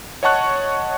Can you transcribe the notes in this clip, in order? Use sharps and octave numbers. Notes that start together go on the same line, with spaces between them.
C#5 D#5 F#5 A5 C#6 F#6